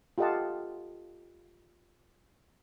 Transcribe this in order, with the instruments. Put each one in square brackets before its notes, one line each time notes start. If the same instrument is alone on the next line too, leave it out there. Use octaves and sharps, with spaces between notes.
[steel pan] F4 G4 A4 D#5 F#5 A5